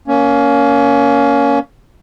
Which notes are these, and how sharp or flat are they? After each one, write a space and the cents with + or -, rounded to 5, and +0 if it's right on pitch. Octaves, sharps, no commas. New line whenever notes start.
A#3 +5 C#4 +20